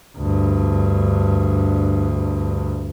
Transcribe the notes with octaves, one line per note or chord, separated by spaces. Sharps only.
D2 G2